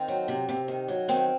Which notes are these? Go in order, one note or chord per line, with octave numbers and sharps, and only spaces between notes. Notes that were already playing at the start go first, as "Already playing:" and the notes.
Already playing: D#3 C4
F#3
C3
C3
D#3
F#3
D#3 C4